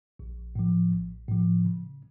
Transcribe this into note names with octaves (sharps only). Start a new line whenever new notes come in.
A#1
A2 F3
A#1
A2 F3
C#3